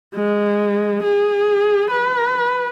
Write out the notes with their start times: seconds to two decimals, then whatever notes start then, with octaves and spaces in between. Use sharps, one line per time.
0.15 G#3
1.03 G#4
1.90 B4